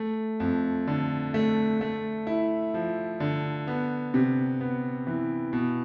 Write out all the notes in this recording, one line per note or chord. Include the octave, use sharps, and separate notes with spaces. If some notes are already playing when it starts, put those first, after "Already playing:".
Already playing: A3
F2
D3
A3
A3
E4
F3
D3
B3
C3
B3
E3
B2